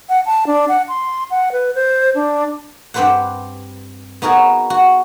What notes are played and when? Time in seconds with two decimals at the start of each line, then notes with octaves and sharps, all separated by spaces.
0.09 F#5
0.26 A5
0.47 D4
0.69 F#5
0.89 C6
1.31 F#5
1.52 B4
1.75 C5
2.15 D4
2.94 G2 C4 G4 B4 C5 F#5
4.22 B3 D#4 F#4 G#4 A#4
4.70 F#4